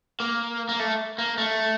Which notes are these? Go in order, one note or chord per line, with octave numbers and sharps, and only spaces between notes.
A#3
A#3
A3
A#3
A3